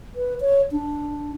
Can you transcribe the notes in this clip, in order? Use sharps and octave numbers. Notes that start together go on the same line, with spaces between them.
B4
C#5
D4